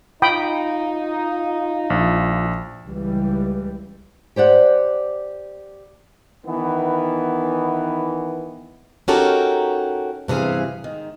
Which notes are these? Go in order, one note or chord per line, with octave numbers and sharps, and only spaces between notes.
D#4 F4 G5 B5 D#6
A#1
C#2 E3 G3
G4 C5 D5 F#5
D#3 E3 B3
C#4 D#4 F#4 G4 A4 A#4
G2 C3 E3 G#4 F5
G#2 D#3